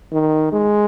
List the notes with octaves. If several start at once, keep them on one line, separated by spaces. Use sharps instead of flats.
D#3
G#3